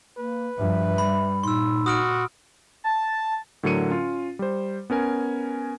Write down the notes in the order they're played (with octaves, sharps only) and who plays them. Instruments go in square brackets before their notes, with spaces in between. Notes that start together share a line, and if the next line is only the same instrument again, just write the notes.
[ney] A#3 [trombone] B4
[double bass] G2 F3 [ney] E5
[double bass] G3 [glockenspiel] B5
[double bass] A#2 [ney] D#4 [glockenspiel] C6 E6
[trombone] F#4 [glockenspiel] D#6 F6 D7
[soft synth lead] A5
[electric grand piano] A2 D3 F#3 A#4 C#7 D#7
C#4 F4
G3 C5
B3 C#4 A#4 G#5